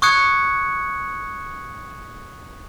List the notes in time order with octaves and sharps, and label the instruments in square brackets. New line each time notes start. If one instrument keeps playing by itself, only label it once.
[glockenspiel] C#6 D#6 F#6 G#6 C#7